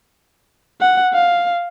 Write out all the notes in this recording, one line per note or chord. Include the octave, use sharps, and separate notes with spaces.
F#5
F5